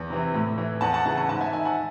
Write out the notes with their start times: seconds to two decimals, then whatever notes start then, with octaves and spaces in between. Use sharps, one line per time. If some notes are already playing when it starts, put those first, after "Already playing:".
Already playing: E2
0.10 C3 E3
0.34 A2
0.58 E3
0.81 E2 F#5 A5
0.93 F#5 A5
1.06 C#3 E3 F#5 A5
1.17 F#5 A5
1.29 G#2 F#5 A5
1.41 E5 G#5
1.53 D#3 E5 G#5
1.65 F#5 A5